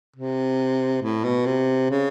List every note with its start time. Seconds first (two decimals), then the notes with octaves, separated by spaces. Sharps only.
0.16 C3
1.02 A2
1.25 B2
1.46 C3
1.90 C#3